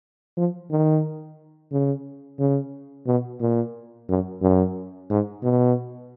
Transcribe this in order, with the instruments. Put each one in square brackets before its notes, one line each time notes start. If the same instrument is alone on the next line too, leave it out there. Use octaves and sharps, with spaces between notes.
[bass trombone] F3
D#3
C#3
C#3
B2
A#2
F#2
F#2
G#2
B2